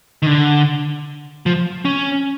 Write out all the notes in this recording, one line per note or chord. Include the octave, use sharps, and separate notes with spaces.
D#3
D3
F3
C#4